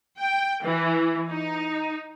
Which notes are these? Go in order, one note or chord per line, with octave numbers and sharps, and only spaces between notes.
G5
E3
D#4